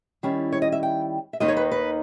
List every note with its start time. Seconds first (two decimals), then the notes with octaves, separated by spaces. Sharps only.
0.23 D#3 G3 C#4 E4
0.52 C#5
0.62 D#5
0.72 E5
0.83 G5
1.33 E5
1.40 D#2 D#3 A#3 D#4 D#5
1.48 C#5
1.57 B4
1.71 B4